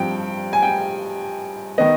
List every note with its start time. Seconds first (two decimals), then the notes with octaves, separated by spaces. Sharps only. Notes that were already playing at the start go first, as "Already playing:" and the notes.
Already playing: G2 F3 C4 G5
0.53 G#5
0.62 G5
1.78 D#3 B3 D#5